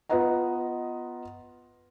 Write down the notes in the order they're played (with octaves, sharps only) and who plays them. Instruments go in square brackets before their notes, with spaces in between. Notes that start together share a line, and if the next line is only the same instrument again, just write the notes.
[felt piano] B3 F4 B4 D#5 F#5 A#5